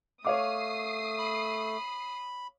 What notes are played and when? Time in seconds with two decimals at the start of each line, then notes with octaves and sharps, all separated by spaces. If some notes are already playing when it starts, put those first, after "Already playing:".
0.25 A3 C#5 F5 D6 D#6 C7
1.19 B5